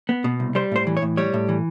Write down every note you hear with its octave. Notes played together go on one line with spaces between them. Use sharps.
B3
B2
C2
G3 C5
A2 C5
E3
C#5
A2
G3 C#5
A2
E3